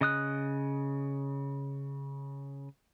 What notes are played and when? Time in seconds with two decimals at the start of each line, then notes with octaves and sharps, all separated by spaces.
0.01 C#3 D#5 D#6 F#6